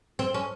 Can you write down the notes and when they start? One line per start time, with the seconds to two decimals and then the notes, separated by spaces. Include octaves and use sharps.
0.19 C4
0.34 C#4